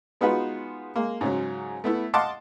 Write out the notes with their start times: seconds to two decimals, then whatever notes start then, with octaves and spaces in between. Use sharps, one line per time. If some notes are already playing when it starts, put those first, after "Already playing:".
0.21 G#3 B3 D#4 F4 F#4 B4
0.96 G#3 A#3
1.21 G#2 C#3 F#3
1.84 A3 B3 E4
2.14 D#5 F5 F#5 A5 C6 D6